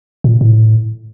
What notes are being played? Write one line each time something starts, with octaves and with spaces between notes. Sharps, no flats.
A#2
A2